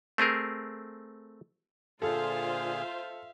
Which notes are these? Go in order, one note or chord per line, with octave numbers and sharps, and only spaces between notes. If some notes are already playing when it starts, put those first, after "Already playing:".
A3 C4 G#4 A#4
A#2 D3 F4 G#4 A4 C5 E5 F5